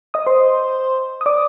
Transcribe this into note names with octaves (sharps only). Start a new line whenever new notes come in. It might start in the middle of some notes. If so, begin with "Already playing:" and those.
D#5 D#6
C5 C6
D#6
D5 D6